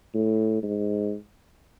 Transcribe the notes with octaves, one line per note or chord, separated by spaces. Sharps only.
A2
G#2